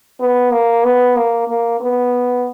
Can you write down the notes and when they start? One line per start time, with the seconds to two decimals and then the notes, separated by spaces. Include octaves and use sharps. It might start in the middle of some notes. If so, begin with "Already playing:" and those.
0.20 B3
0.52 A#3
0.84 B3
1.16 A#3
1.48 A#3
1.80 B3